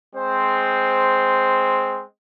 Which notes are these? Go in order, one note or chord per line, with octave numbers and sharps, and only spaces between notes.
G#3 C4 C5